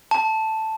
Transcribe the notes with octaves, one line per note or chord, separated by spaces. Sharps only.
A5